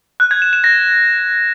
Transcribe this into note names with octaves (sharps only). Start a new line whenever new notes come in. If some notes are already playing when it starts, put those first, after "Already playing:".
F#6
G#6
E7
E7
A#6